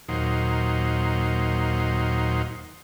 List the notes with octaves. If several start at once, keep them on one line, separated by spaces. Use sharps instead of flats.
D#2 A#2 F#3 D#4 C5